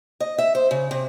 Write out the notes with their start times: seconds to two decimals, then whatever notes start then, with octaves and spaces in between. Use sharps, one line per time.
0.20 D#5
0.38 E5
0.55 C5
0.71 C#3
0.91 C3